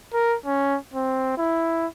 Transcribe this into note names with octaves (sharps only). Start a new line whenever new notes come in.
A#4
C#4
C4
E4